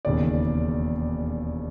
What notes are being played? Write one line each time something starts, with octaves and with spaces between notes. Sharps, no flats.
E1 D#2 C#3 D5